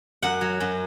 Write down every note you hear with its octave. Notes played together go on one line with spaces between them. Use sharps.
F#2 F#5
F#3
F#2